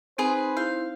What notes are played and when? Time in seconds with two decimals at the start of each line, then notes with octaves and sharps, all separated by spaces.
0.18 C4 D#4 G#4 B4 C5
0.57 E4 F5 G6